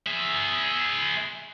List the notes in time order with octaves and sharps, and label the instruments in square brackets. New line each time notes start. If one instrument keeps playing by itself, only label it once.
[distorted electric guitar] G#4 E5